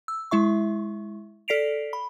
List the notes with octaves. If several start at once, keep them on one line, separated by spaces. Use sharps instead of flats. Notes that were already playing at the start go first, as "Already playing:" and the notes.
E6
G#3 E4 E5 C#6
A4 D5 B6 C7 D7 F7
B5